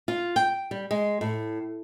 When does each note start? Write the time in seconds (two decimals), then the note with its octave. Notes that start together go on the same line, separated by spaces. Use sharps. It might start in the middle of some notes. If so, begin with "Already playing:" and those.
0.08 F4
0.36 G5
0.71 G3
0.91 G#3
1.21 A2